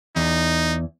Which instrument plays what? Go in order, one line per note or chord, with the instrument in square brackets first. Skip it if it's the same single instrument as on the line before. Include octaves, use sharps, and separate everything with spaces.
[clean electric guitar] E2 [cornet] D#4